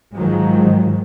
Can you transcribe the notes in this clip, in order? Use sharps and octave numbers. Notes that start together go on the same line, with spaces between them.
G#2 D#3 F3 F#3 G#3